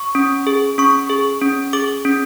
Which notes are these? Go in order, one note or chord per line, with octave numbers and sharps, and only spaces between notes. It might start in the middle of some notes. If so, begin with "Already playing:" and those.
Already playing: C#6
C#4
G#4
C#4 C#6
G#4
C#4
G#4 D6
C#4